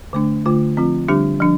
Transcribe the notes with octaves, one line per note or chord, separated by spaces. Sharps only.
D3 A3 D4
D3 A3 F4
F3 C4 F4
D3 G3 D4 G4
F3 D4